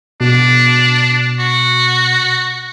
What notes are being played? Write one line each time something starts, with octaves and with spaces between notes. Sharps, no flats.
B2 D4
F#4